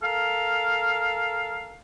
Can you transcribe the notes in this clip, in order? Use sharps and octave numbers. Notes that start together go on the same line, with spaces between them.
A4 A#4 F5